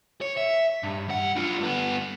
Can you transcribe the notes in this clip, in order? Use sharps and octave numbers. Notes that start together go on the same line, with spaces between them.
C#5
E5
G2
B1 F#5
D4 F4
G2 B3